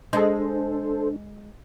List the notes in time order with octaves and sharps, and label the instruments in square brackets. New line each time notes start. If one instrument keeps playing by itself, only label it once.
[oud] G#3 [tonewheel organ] D4 [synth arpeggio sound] A4 C5